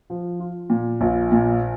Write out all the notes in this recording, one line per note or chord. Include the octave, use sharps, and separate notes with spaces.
F3
F4
A#2
A#1
A#2